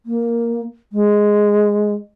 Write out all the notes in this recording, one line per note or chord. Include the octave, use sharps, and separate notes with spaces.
A#3
G#3